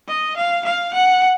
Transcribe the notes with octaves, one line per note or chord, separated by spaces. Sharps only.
D#5
F5
F5
F#5